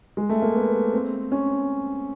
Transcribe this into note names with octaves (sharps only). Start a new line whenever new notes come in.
G#3
A3
A#3
B3
C4
C#4